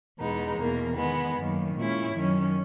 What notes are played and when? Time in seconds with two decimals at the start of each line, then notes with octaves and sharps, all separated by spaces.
0.18 E2 B2 G#3 B3 D#4
0.57 E2 B2 A#3
0.97 D#3 G#3 B3
1.36 F#2 D#3 A#3
1.75 A#2 G#3 C#4 E4
2.14 F#2 D#3 F#3 C#4